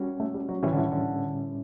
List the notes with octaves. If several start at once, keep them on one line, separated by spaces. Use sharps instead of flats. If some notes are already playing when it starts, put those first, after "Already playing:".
Already playing: G3 C#4 F#4
A3
G3
F#3
A2 E3 G3 C#4 E4
D3
E3
D3